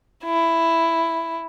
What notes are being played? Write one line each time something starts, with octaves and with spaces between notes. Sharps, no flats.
E4